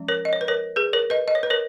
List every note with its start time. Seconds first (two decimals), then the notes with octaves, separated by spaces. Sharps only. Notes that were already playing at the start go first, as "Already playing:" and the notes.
Already playing: F3 G#3 C#4
0.08 A#4 C#5
0.25 D#5
0.33 C#5
0.41 B4
0.48 A#4 C#5
0.76 G#4 B4
0.93 A#4 C#5
1.10 B4 D#5
1.28 D#5
1.35 C#5
1.43 B4
1.50 A#4 C#5